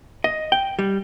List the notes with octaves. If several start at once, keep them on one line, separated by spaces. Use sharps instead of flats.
D#5
G5
G3